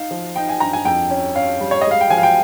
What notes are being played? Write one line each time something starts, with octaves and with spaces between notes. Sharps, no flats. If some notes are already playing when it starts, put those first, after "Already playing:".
Already playing: D#4 F5
F3
D#4 G5
G#5
G2 A#5
G#5
F2 G5
C#4
C#4 F5
G3
C#5
G#3 D#5
F5
G5
F3 G#5
F5
G5